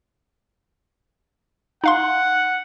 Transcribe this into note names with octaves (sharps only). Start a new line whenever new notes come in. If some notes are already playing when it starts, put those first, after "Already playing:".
D#4 F5 F#5 C6